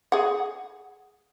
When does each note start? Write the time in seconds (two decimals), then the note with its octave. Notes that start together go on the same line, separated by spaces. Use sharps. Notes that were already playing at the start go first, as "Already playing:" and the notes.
0.12 G#4 F#5